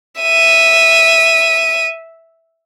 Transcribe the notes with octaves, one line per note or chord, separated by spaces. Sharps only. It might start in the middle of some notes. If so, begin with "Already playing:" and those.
E5 D#7